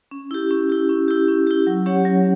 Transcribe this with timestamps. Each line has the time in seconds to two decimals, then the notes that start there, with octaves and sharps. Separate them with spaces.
0.11 C#4
0.31 E4 G4
0.51 C#4
0.69 E4 G4
0.89 C#4
1.08 E4 G4
1.28 C#4
1.47 E4 G4
1.67 F#3
1.86 C#4 G4 C#5 F#5
2.05 F#3